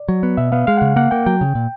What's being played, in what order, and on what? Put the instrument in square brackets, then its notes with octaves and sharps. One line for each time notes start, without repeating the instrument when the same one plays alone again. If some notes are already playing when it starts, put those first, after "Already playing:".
Already playing: [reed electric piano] D5
[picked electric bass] F#3
B3
[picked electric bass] B2 [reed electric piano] E5
[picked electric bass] B3 [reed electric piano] F5
[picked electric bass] G#3 [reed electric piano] F5
[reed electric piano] F#5
[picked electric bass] C#3
[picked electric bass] A#3 [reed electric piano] F#5
[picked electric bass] A#3 [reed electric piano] G5
[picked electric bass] F#3 [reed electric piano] G5
[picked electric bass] C#3
A#2